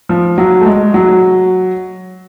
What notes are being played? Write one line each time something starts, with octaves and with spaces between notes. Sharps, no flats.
F3
F#3
A3
G#3
F#3